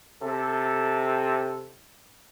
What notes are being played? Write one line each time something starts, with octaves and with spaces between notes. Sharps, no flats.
C3 A4